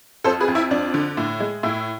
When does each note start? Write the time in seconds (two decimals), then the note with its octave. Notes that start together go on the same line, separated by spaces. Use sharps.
0.24 F2 A4 C5
0.40 G#4 B4
0.48 F2
0.55 E4
0.71 F2 D4
0.94 D3
1.17 A2
1.40 G#3
1.63 A2 E4